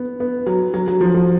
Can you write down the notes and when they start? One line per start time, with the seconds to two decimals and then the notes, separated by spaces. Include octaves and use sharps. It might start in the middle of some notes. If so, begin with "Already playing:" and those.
Already playing: B3
0.20 B3
0.46 F#3
0.74 F#3
0.88 F#3
1.01 F3
1.14 F3